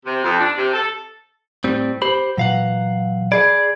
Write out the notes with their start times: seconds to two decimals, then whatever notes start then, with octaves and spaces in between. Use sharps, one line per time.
0.05 C3
0.24 F2
0.40 D4
0.56 C3
0.72 A4
1.64 A2 G3 C4
2.02 G4 C5 B5
2.37 A#2 E3 F#3 F5 F#5
3.32 G#4 D5 B5 G#6